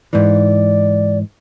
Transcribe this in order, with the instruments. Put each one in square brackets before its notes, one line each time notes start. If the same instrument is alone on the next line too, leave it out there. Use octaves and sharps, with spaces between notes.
[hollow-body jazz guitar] G#2 E3 [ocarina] D5